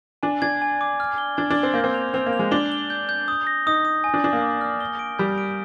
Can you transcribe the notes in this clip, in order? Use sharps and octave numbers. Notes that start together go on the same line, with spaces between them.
D4 G#5
D4 G#6
G#5
D6
F6
G7
D4 G#6
D4
G7
C4
A#3 G6
C4
F7
C4 F7
A#3
F7
G#3
D4 G7
G7
G6
G6
D#6
A#6
D#4 D#6
D#6
G#5
D4
D4 G#5
A#3
D6
F6
G7
D7
G3 G6
D7